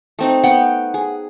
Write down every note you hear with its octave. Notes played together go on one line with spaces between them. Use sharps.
A3 C4 D#4
B3 F#5 G5
G#4